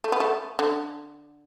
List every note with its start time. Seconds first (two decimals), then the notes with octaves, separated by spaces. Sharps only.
0.04 A3
0.12 B3
0.20 A3
0.59 D3